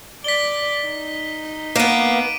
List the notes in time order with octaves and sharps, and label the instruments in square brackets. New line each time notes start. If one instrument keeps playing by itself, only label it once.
[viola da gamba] D5 [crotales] B6 G7
[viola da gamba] D#4
[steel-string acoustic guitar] A#3 B3 [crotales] D6 D7 D#7